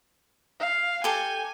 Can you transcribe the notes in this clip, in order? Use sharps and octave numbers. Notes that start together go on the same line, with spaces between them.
F5
G4 A4 G#5